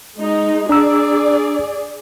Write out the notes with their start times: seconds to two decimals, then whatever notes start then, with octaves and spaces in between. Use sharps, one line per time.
0.16 G#3 D#4
0.69 D4 G#4 D5 A#5 E6